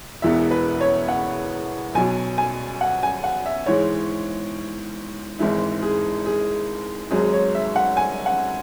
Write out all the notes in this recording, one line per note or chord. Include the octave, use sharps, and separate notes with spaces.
E1 E2 E3 B3 E5
B4
C#5
F#5
B1 B2 F#3 G#5
G#5
F#5
G#5
F#5
E5
G#2 E3 G#3 C#5
G#1 G#2 E3 G#3 E4
G#4
G#4
G#1 G#2 F#3 G#4
C#5
E5
F#5
G#5
F#5